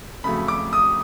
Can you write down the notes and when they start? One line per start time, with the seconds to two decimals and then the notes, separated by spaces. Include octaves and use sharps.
0.24 F2 C#3 F#3 A3 B5
0.48 D6
0.73 D#6